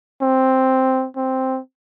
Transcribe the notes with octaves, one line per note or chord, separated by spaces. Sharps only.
C4
C4